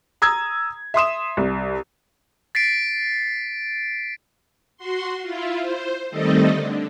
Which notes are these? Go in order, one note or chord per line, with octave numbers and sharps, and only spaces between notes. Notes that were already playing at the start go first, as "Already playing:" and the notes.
A#5 D#6 E6 G#6
E5 C6 D#6 E7
C2
A6 B6 C7 D7
F#4 C6
E4 F4
C5
D#3 G3 A3 C4 A4 D#5
D3